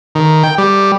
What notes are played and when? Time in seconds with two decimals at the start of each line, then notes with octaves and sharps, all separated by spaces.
0.15 D#3
0.43 G5
0.58 G3